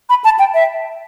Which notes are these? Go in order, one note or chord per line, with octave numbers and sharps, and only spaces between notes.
B5
A5
G5
E5